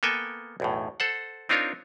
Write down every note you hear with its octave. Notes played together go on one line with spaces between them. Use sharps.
A#3 B3 A4 G5 G#5
B1 E2 A2
A4 C5 F#5
C4 D4 D#4 F4 A#4 C#5